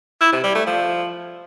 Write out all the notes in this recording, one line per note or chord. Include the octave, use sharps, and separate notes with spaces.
E4
C3
G3
A3
F3